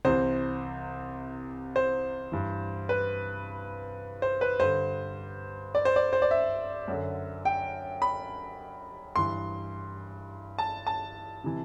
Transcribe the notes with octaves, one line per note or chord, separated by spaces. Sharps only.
C2 C3 E3 C5
C5
G2 E3
B4
C5
B4
G2 D3 C5
D5
C5
D5
C5
D5
E5
F#2 D3
G5
B5
G2 E3 C6
A5
A5
C3 E3